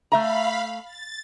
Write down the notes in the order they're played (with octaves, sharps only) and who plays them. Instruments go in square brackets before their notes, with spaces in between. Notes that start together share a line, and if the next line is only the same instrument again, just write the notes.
[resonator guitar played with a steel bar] A3 E5 A#5 [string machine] F5 B5
[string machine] A6